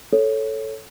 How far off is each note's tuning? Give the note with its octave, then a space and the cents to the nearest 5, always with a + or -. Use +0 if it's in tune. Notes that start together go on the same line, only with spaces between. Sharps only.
A4 +0 C#5 +0